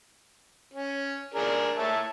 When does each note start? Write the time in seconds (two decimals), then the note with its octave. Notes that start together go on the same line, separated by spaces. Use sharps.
0.74 C#4
1.34 D4 G#4 A#4
1.77 C#5 E5 A5